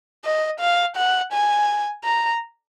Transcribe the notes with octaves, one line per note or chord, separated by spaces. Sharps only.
D#5
F5
F#5
G#5
A#5